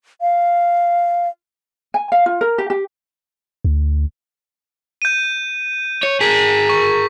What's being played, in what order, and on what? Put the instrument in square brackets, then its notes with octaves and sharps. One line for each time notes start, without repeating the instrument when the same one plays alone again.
[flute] F5
[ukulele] G#5
F5
F4
A#4
G4
G4
[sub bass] D2
[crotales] G6 D#7
[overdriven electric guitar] C#5
[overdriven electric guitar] G#4 A#4 [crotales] B6
[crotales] C#6